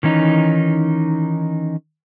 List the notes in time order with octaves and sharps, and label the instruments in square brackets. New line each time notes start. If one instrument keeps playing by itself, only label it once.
[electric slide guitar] D#3 E3 C#4 D#4